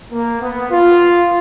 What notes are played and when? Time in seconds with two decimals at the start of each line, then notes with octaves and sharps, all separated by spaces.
0.12 A#3
0.41 B3
0.71 F4